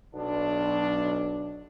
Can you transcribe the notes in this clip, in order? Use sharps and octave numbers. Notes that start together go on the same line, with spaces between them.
B1 D4